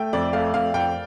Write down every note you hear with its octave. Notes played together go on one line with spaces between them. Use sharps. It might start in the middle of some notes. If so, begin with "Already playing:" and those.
Already playing: A3 G5
F2 D5
A3 F5
F2 F5
F2 G5